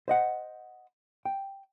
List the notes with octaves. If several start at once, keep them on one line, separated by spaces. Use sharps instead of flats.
C5 D#5 F#5
G5